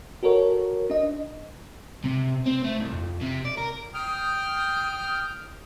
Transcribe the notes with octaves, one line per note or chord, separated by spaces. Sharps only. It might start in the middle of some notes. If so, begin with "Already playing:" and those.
F#4 A4 A#4 C#5
D4 D#5
C3
C4
A3
C2
F2
C3
D5
A#4
G5 D#6 F6 G6